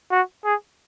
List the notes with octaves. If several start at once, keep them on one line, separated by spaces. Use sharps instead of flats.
F#4
G#4